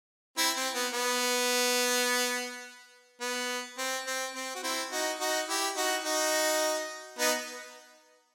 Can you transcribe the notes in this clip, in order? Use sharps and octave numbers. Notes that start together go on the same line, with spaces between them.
C4 E4
C4
B3
B3
B3
C4
C4
C4
F#4
C4 E4
D#4 F#4
D#4 F#4
E4 G4
D#4 F#4
D#4 F#4
B3 D#4